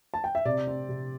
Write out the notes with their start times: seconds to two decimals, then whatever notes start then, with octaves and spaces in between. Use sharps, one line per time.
0.14 A5
0.24 G5
0.35 E5
0.45 C3 D5
0.67 C4
0.89 C3